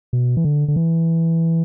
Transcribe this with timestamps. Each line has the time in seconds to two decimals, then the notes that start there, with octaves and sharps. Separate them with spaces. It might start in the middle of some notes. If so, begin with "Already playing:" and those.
0.13 B2
0.37 E3
0.44 D3
0.68 D3
0.76 E3